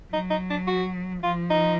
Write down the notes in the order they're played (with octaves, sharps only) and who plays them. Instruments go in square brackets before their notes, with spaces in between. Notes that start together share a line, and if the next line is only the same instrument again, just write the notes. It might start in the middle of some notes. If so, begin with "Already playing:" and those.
[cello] F#3 [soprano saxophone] D#4
[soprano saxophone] D#4
D4
F#4
[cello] F3 [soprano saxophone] F4
[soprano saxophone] D#4